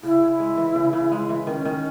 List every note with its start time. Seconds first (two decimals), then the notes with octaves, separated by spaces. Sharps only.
0.03 C#3 E4
0.22 C#3
0.40 G#3
0.57 E3
0.75 C#3
0.93 C#3
1.12 G#3
1.29 E3
1.47 D#3 C#4
1.65 D#3